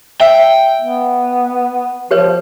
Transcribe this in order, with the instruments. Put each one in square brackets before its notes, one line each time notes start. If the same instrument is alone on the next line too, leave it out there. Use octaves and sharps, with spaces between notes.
[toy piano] E5 E6 [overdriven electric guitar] G5
[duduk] B3
[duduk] F3 [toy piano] G4 B4 C#5